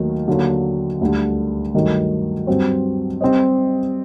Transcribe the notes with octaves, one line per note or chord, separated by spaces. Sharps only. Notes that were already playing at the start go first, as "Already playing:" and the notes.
Already playing: D#2 D#3 F#3 A3
D#2 D3 F#3
D2 D3 G3
G2 D#3 F#3 A3
G2 F#3 C4 F#4 C5
G3 C4 G4 C5 D#5